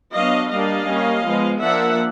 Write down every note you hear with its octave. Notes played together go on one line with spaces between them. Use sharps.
F#3 B3 D4 D#5 F5
G3 A#3 D4 D#5 F5
G3 A#3 C#4
F3 G#3 B3
F3 A#3 D4 E5 F#5